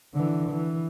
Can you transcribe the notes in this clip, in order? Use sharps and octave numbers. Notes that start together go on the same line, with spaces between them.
D3 E3
E3